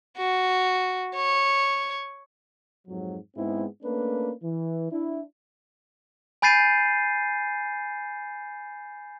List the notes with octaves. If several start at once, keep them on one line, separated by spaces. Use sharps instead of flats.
F#4
C#5
F2 G#2 F#3
G#2 G#3 B3 C4 E4
A3 A#3 C#4 D4 B4
E3
D4 E4
G#5 B5 G6 A6 C7 D#7